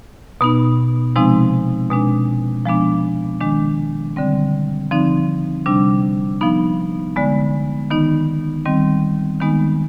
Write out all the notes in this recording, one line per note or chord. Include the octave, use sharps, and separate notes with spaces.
B2 B3 D#4
C3 F3 G#3 C4 D#4
B2 G#3 D4
F3 G#3 B3 D4
D#3 G#3 D4
D3 G3 C4
D3 F3 C4 D#4
C3 G3 D4
F3 B3 D#4
D3 G#3 B3
D#3 B3 D#4
D#3 G3 C4
D#3 G#3 B3 D#4